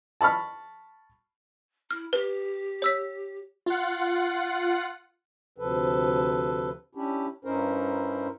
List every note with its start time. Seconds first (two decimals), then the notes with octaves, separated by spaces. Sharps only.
0.21 A5 B5 C#6 F6
1.91 E4 F6
2.13 G4 B4
2.82 C#5 E6 B6
3.66 F4 F#5
5.58 D2 C3 F3 A4 B4
6.95 C#4 D4 E4 G4
7.45 G2 C#4 D#4 E4 A#4 C5